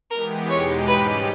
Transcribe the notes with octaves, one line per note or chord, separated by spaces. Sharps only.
E3 G#3 B3 G4 A#4
E2 B2 G#3 D#4 G4 C#5
G#2 G3 C#4 G4 B4